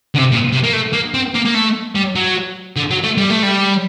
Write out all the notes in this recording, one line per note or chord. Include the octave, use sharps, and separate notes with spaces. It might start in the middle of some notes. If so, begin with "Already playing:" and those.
D3
C3
A#2
C3
A#3
A3
A#3
C4
A#3
A#3
A3
G3
F#3
D3
F#3
A3
G3
A3
G3